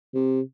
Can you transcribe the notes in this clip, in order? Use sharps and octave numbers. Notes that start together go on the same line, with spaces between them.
C3